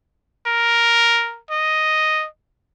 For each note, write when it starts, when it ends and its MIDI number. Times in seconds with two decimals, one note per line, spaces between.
0.47 1.39 70
1.51 2.26 75